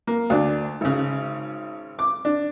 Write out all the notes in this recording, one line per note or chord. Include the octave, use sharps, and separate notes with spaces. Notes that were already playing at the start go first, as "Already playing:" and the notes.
A#3
D2 D4
G#1 C#3
D6
D4